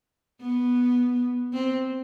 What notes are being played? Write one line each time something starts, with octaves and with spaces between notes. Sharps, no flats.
B3
C4